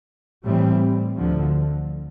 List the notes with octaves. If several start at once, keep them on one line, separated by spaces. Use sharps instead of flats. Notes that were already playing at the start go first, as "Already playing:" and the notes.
A2 E3 G3 C4
D2 D3 F3